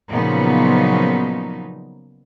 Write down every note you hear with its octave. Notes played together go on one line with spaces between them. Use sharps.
A#2 C#3 F3 F#3 B3 D#4